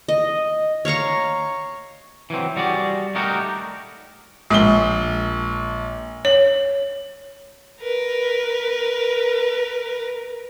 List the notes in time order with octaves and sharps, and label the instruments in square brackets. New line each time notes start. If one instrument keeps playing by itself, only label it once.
[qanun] D#5
C#5 F5 A#5 C#6
[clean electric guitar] E3 F#3 C4
G3 F#4 G#4 D5
G3 A3 D#4 F#4 G4 A#4
[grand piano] A#1 G7 [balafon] G#3
[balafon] C#5 [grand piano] F#7
[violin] A#4 B4